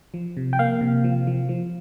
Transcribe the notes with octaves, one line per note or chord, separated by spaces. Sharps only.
F3
C3
G5
A#3 F5
C3
F3
F3
F3